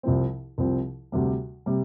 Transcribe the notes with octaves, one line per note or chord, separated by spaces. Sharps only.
C2 C3 F3 C4
C2 C3 F3 C4
D2 C3 G3
C3 G3